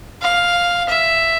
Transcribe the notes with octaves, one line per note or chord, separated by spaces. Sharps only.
F5
E5